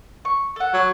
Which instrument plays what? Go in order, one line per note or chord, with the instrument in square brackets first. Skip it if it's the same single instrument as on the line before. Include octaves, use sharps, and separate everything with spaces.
[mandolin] C#6
A4 F#5
[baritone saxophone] F#3